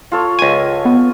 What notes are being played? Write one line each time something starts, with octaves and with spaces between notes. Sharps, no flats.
F4 A4 C#5
C#2 G#5
B3